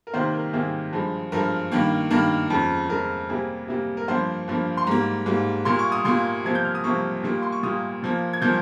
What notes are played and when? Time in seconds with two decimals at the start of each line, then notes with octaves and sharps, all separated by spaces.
0.07 A#4
0.13 C3 D#3 A#3 C5
0.34 A#4
0.53 C3 D#3 A#3 G#4
0.92 G2 F3 G#3
1.32 G2 F3 G#3 A#4
1.72 G2 D#3 A#3
2.10 G2 D#3 A#3 A#4
2.50 F2 C#3 G#3
2.90 F2 C#3 G#3 A#4
3.29 C3 G3 A#3 G#4
3.68 C3 G3 A#3
3.97 A#4
4.07 G2 F3 A#3 C5
4.48 G2 F3 A#3
4.77 C6
4.87 G#2 G3 A#3 A#5
5.26 G#2 G3 A#3
5.65 A#2 G3 A#3 C6
5.79 C#6
5.92 D#6
6.05 A#2 G3 A#3 C6
6.44 C3 F3 A#3 G#6
6.55 G6
6.65 F6
6.75 D#6
6.84 C3 F3 A#3 C#6
7.23 A#2 G3 A#3
7.42 C6
7.52 C#6
7.63 A#2 G3 A#3 D#6
8.02 A#2 F3 A#3
8.33 G#6
8.42 A#2 F3 A#3 G6